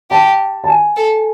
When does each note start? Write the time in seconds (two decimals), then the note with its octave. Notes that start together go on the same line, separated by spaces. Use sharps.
0.11 G4 A5
0.64 A5
0.68 G#5
0.97 A4